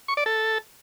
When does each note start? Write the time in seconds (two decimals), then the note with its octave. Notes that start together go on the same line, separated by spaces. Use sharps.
0.08 C#6
0.17 D5
0.26 A4